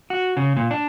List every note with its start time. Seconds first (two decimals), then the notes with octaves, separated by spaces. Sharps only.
0.10 F#4
0.37 C#3
0.57 A#2
0.71 D4